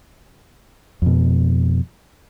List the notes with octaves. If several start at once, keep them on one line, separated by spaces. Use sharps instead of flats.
F2 B2